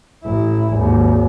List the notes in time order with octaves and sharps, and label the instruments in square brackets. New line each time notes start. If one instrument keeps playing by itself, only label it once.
[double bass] A1 E4
G#1 D#2